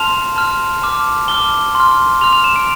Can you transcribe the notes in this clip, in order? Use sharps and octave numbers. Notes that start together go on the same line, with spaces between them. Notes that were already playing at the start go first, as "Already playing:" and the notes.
Already playing: A5 C6 F6 F7
A5 C6 F6
A5 D6 F6
A5 D6 F6 G7
C6 F6
C6 F6 F7
F7
E7
D7